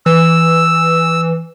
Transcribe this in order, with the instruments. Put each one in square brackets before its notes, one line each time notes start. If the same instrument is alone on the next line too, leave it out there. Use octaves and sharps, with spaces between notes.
[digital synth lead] E3 [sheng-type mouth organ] E6